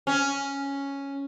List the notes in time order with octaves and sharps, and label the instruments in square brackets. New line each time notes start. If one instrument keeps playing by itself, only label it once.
[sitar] C#4